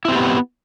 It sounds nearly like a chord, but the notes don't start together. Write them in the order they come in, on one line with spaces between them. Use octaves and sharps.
E4 C4 G4 B3